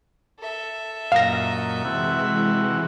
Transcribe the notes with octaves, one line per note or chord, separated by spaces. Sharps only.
A4 E5
F#2 A#2 D#5 F5 A#6
C3 E3 G#3 E4 F#4